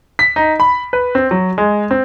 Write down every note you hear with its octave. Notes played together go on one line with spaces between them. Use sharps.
B6
D#4
B5
B4
C4
F#3
G#3
C4